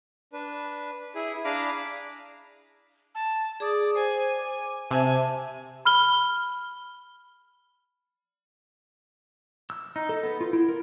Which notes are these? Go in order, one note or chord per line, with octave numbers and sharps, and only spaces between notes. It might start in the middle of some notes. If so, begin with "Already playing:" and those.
D4 B4
E4 G#4
D4 G#4 F5 A#5 B5 D6
A5
G#4 D5 D#6
C5 G#5
D6
C3 E5 G#5 A5
B5 F6 G7
E6
D#4
A4
B3
F4
E4
A#4